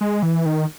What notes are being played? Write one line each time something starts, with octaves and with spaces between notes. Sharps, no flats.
G#3
E3
D#3